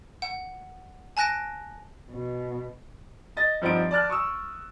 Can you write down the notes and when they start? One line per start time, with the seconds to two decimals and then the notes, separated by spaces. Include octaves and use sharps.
0.22 F#5
1.17 G#5 A5 F#6 A#6 D7
2.11 B2
3.37 D#5 A6 A#6
3.62 G2 F3 C4 D#4 F#5 D7
3.91 D5 A5 F6 F#6
4.10 C#6 D#6 E6